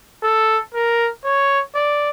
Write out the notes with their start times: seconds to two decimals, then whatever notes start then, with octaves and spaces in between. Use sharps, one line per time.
0.23 A4
0.74 A#4
1.24 C#5
1.75 D5